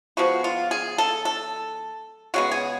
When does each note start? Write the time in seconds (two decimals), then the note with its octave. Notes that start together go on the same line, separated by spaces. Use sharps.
0.17 F3 G#3 B3 F#4
0.44 F4
0.71 G#4
0.98 A4
1.25 A4
2.34 C#3 G#3 B3 F#4
2.52 G#4